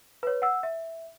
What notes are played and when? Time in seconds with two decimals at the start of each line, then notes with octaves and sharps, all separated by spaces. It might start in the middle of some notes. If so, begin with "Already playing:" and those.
0.23 B4 C#5
0.42 F#5 E6
0.63 E5